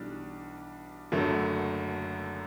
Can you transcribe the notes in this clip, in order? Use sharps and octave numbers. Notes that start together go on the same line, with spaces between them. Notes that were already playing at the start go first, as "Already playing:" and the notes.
Already playing: B1 E3 G3 D4
F#1 F#2 D3 F#3 A3